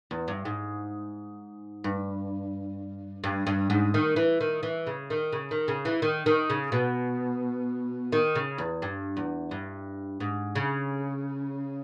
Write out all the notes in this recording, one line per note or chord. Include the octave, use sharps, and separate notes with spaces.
E2
G2
G#2
G2
G2
G2
G#2
D#3
E3
D#3
E3
C#3
D#3
C#3
D#3
C#3
E3
D#3
D#3
C#3
B2
D#3
C#3
E2
G2
E2
G2
G#2
C#3